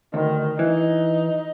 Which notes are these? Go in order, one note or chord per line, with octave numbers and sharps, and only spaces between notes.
D2 D#3
E3 D#4